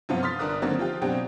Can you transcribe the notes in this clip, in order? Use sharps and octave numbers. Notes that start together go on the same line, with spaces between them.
G2 C3 F3 F#3 B3 F4
C6 D#6 F6 A6 B6
G1 D4 A#4 D#6 F#6
D3 D#3 F#3 A#3 C4
F3 F4 G4
B2 F#3 C4 D4 G4